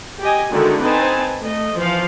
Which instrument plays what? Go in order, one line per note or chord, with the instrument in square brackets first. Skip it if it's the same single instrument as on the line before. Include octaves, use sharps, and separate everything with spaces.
[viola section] G4 D#5 G#5
D3 D#3 G#3 A3 E4 F#4
C4 D#4 B4 G#5 A5
A3 D#5
E3 F3 C5 F5